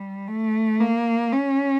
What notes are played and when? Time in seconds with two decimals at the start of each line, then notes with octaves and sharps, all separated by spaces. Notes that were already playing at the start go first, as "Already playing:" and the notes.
Already playing: G3
0.27 A3
0.80 A#3
1.33 C#4